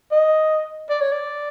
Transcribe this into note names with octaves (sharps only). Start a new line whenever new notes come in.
D#5
D5
C#5
D5